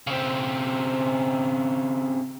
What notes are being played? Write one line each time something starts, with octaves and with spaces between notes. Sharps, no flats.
C#3 C4